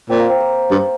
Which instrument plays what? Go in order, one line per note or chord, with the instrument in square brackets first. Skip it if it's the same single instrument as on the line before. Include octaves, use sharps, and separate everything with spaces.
[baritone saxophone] A#2 [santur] C4
[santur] A#3
C4
A#3
[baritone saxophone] G2